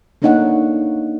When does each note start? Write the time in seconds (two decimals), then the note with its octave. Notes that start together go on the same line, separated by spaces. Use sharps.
0.22 A3 A#3 D4 D#4 C#5 F#5